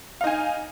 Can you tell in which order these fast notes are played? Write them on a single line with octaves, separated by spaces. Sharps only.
F5 D#4 G#5